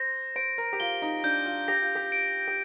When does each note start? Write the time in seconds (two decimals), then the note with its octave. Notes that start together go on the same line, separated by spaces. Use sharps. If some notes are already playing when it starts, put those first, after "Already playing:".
Already playing: C5 A#6
0.36 C5 D7
0.58 A#4
0.73 G4
0.80 F4 G7
1.02 D#4
1.24 D4 G6
1.46 F4
1.68 G4 A#6
1.82 F4
1.96 G4
2.12 D7
2.48 G4